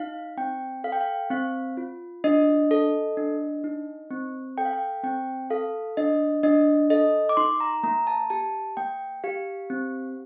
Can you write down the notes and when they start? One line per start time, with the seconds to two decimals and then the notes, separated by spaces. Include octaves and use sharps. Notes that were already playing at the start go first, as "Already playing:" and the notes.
Already playing: D#4 F5
0.37 C4 G5
0.84 A4 F5
0.92 G5
1.01 F5
1.30 C4 F5
1.77 F4
2.24 D4 D#5
2.71 A4
3.17 D4
3.64 D#4
4.11 C4
4.57 A4 G5
4.65 F5
4.73 G5
5.04 C4 G5
5.50 A4 F5
5.97 D4 D#5
6.43 D4 D#5
6.90 A4 D#5
7.29 D6
7.37 D#4 C6
7.60 A#5
7.83 A#3 A#5
8.07 A5
8.30 G4 A5
8.77 A#3 G5
9.24 G4 F5
9.70 C4